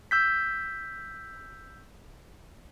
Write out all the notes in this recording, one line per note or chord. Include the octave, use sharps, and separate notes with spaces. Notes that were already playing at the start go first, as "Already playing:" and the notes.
E6 G6 B6